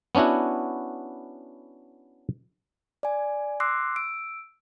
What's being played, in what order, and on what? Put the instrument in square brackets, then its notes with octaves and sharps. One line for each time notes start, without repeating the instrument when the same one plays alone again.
[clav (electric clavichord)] B3 C#4 D4 E4 F#4
[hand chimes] D5 G#5
C6 D6 E6 F#6 A#6 C7
E6 D7